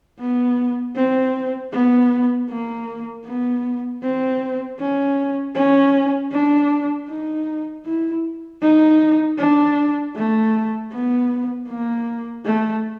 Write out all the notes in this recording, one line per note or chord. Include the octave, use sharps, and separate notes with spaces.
B3
C4
B3
A#3
B3
C4
C#4
C#4
D4
D#4
E4
D#4
D4
A3
B3
A#3
A3